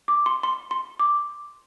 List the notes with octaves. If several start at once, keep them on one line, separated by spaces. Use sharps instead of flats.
D6
C6
C6
C6
D6